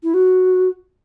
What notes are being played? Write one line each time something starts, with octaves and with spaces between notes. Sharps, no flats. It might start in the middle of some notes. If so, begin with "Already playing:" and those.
E4
F#4